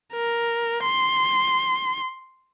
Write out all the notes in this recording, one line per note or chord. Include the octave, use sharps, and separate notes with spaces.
A#4
C6